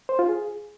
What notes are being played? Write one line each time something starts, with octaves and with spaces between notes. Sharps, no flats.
C5
F4
G#4